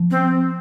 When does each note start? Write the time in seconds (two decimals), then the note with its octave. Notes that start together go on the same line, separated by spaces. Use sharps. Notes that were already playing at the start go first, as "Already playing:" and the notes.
Already playing: F3
0.11 C4